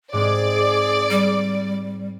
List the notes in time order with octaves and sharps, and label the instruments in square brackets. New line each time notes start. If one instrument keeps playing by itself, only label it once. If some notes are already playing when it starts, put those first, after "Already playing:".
[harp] G#2 G#3 C4 [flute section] G#4 D6 [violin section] D5
[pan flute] G3